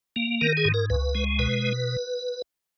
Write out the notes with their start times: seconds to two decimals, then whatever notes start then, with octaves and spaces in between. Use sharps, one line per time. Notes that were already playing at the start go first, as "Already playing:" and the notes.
0.16 A#3
0.41 D#3 A#4
0.57 G#4
0.65 G#2
0.74 A#4
0.90 C#2 B4
1.15 G#3
1.39 B2 B4